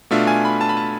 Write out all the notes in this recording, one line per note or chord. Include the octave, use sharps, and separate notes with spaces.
B2 A3 D4 F4 E5
G#5
B5
A5
B5
A5